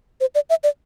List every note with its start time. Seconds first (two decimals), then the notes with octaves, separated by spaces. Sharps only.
0.21 C5
0.35 D5
0.50 E5
0.63 D5